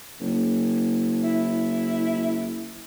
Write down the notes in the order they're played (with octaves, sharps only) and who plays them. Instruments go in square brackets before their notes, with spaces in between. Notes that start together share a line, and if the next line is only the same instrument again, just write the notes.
[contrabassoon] F#1
[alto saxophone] E4